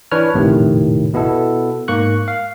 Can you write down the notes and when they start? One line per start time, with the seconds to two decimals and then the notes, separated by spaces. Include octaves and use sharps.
0.11 E3 D4 B4 C#5 F6
0.34 A#1 F2 A2 C3 D#3
1.14 B2 B3 E4 A4
1.88 G#2 A#3 C#6 F#6
2.28 F5